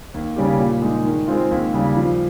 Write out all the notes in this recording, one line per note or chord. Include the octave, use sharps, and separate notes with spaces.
D#2
C#3 G3 C#4 G4
A#2
G#3 D#4
D#3
G#3 C4 F4
D#2
C#3 G3
F3